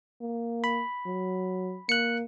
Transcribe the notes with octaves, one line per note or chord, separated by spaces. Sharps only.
A#3
B5
F#3
A#3 F#6 C#7